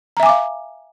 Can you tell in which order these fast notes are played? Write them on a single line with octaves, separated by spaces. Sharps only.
A#5 E5 G#5 D6 F5